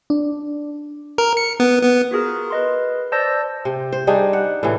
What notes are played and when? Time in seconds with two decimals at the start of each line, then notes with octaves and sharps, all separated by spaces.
0.10 D4
1.18 A#4
1.37 C#7
1.60 B3
1.83 B3
2.11 F4 F#4 G#4 A#4
2.50 B4 D#5 C6
3.12 C5 D5 A5 E6 G6 A#6
3.65 C3
3.92 C5
4.07 G3 D4 D#4 G#4
4.33 F#5
4.63 A2 C3 E3